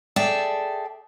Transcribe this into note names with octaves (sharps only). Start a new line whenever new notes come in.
G#4 A4 D5 E5 G5 A5